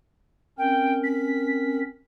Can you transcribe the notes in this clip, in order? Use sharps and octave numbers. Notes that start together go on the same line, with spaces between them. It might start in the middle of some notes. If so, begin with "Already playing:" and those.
C4 C#4 A#4 G5
B6